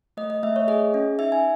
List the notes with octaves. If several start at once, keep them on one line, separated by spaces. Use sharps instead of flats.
A3 D#5
D#5
A3 E5
C#5
G#4 D#5
C#4
D#4 E5
G#5